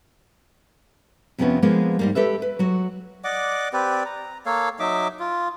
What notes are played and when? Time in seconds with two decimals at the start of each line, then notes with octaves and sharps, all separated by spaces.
1.38 F2 C3 F3 A#3 B3 C#4
1.62 F3 G#3 A#3 B3 D4
1.99 G#2 G3 A#3
2.15 G4 A4 B4 E5
2.42 B4
2.59 F#3 F#4
3.24 D5 D#5 F#5 D6
3.73 C4 G4 B4 D5
4.05 A#5
4.46 A#3 A4 C#5 F5
4.80 F#3 D#4 E5 D6
5.20 F4